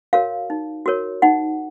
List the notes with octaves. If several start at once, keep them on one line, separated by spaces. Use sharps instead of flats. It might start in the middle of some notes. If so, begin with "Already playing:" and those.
F#4 A#4 C#5 F5
D#4
F#4 A#4 C#5
D#4 F#5